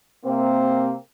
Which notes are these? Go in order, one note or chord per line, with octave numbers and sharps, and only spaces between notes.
C3 A#3 C4